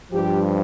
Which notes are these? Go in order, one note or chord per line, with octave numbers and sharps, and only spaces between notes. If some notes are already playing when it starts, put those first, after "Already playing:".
G2 F3 G4